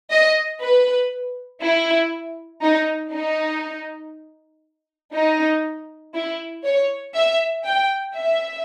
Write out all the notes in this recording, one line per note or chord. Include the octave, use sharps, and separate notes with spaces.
D#5
B4
E4
D#4
D#4
D#4
E4
C#5
E5
G5
E5